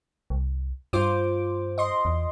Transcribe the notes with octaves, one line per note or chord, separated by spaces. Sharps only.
C2
G2 F4 C5 D6
D#5 C6
E2